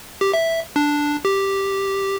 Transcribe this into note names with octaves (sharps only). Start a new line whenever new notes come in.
G4
E5
D4
G4